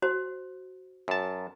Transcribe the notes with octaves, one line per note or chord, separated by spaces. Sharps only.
F#4 C5
F#2 A5